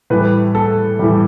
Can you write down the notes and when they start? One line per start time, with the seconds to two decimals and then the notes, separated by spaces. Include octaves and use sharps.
0.10 A2 E3 G3 B4
0.55 A4
0.99 A2 E3 G3